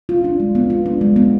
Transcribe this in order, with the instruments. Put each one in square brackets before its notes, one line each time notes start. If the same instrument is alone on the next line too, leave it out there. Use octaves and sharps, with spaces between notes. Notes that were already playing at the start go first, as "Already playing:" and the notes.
[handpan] F4
D4
G#3
B3
F4
D4
G#3
B3